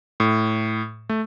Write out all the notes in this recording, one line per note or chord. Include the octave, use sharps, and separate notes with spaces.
A2
A3